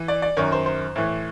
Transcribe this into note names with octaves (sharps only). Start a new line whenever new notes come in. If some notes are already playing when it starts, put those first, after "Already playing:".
Already playing: E3
D5
D5
F#2 D#3 C#5
C5
C5
A2 E3